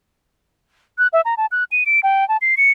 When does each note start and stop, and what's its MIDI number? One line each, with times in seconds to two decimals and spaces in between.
0.98 1.07 90
1.13 1.21 76
1.25 1.34 82
1.37 1.46 81
1.51 1.64 90
1.72 1.84 99
1.86 2.00 98
2.03 2.27 79
2.29 2.37 81
2.41 2.55 96
2.57 2.71 97